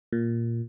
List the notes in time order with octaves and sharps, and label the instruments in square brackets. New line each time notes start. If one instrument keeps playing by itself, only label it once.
[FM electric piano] A#2